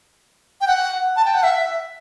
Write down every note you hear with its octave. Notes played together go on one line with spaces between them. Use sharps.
G5
F#5
A5
G5
F#5
E5